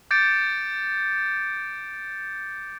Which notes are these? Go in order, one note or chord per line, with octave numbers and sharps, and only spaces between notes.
D6 G6 A6 C#7 D7